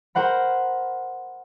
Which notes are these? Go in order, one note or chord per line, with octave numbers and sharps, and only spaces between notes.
A#4 C5 F#5 B5